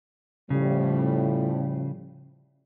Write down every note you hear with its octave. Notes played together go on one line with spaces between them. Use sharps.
A2 C#3 F3 G3